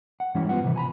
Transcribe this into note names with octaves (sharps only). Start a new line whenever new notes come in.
F#5
G#2 E3 G3 C#4 E4
B3 F4 F#5
C3 E3
G#5 A#5 B5